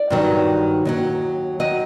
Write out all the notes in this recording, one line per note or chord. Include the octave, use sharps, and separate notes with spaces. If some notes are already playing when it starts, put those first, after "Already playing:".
Already playing: D5
G2 D#3 F#3
D#2 D#3 F#3
D#3 F#3 D#5